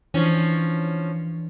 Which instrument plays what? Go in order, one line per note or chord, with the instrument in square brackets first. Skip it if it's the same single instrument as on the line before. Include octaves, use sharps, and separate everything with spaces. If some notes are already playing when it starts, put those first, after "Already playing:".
[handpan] E3 D4 [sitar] F3 C#4